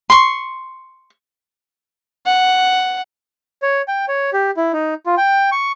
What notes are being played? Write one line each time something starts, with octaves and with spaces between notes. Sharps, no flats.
C6 C#6
F#5
C#5
G5
C#5
G4
E4
D#4
F4
G5
C#6